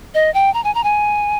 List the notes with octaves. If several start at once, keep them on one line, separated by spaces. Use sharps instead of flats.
D#5
G5
A#5
G#5
A#5
G#5